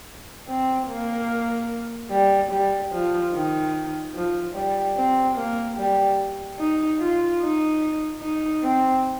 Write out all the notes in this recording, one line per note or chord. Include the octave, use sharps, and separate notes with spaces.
C4
A#3
G3
G3
F3
D#3
F3
G3
C4
A#3
G3
D#4
F4
D#4
D#4
C4